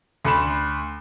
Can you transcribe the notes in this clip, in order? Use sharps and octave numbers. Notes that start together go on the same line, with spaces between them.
D2 B5 E7